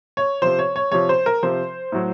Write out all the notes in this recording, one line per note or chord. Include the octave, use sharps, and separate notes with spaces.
C#5
C3 F3 C5
C#5
C#5
C3 F3 C#5
C5
A#4
C3 F3 C5
A2 F#3